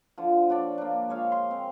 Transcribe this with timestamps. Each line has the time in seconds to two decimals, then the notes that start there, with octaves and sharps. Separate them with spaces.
0.18 D3 F3
0.50 D4 C#5 D5
0.78 A#3 D4
1.09 G#3 C#5 F5
1.32 C6
1.51 C4